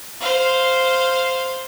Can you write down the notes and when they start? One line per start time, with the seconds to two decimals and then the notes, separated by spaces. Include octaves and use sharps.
0.21 C5 F5